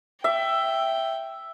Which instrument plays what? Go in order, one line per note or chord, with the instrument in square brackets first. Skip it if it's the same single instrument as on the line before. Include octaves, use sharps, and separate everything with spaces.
[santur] E5 [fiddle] G5